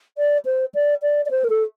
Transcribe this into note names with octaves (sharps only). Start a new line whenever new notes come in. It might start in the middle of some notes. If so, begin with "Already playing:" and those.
D5
C5
D5
D5
D5
C5
A#4
A4